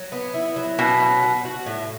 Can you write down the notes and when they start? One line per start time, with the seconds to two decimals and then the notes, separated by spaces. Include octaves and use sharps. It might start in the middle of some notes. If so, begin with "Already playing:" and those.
Already playing: F#3
0.12 B3
0.34 E4
0.56 F#3
0.78 B2 C#4
1.00 C#4
1.23 F#4
1.45 F#4
1.66 A2